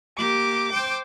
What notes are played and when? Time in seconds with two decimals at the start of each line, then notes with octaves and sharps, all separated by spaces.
0.18 A#3 G4 D6
0.73 C5 G5